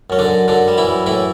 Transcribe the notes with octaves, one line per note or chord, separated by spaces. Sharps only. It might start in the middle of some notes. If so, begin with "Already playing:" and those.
F#2 C#4
D3 D4
F#2
F#2 D3 D4
G3
E3 E4
F#2
A2 E3 E4